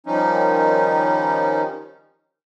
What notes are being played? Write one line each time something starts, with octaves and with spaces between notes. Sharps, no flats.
D#3 F3 G3 C#4 D#4